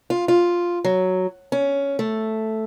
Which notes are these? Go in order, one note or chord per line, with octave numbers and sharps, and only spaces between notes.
F4
F4
F#3
C#4
A3